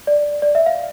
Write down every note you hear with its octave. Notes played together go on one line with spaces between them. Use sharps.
D5
D5
E5
F5